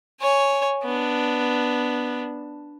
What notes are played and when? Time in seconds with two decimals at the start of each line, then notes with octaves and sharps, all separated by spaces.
0.21 C#5 G#5
0.84 B3 D4